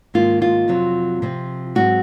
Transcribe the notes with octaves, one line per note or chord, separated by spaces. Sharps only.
G#2 D#3 A#3 F4
F4
F2 C3 F#3 C4
C3 F3 C4
G#2 F#3 C4 F#4